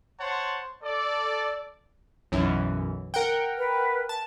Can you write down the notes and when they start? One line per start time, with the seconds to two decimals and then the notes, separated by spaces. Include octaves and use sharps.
0.20 C5 C#5 F#5 A5 C6
0.83 A4 D5
2.32 B1 F#2 E3
3.14 A#4 F#5 G5
3.58 B4
4.09 A5